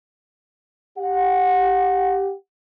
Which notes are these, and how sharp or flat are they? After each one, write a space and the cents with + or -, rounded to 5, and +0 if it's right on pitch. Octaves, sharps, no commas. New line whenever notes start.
G4 +0 F#5 -20